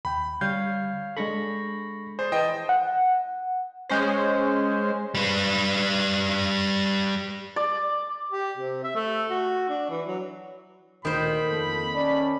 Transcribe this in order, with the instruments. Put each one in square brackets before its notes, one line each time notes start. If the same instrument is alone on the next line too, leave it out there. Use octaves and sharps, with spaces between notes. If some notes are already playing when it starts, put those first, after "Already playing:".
[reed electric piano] D#2 G5 [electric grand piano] B5
[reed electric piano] D3 G3 [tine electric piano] C#5 F5 [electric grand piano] G6
[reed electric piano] G#3 D4 A4 [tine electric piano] B5 C#6 A#6
[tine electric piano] G#4 D5 [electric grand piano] C5
[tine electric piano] E3 A5 [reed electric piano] E4 B4 [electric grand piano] D#5 G5
[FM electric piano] F#5
[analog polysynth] G#3 C#4 C5
[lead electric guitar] G3 B4
[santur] D5
[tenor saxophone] G4
C3
E5
A3
F#4
D4
E3
F#3
[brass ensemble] D2 A#2 [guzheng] D#3 C5 [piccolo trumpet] B5
[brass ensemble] F2 A#3 A4
C#4 D5 A5